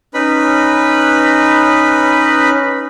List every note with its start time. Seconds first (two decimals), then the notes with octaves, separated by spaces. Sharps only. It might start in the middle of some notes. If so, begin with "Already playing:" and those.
0.14 C#4 D#4 B4 B5